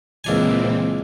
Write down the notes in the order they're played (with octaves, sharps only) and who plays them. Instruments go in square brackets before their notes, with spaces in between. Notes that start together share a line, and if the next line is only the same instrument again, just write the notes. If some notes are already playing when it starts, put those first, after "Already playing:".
[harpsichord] C#2 D4 G#5 [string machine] A#2 E3 C4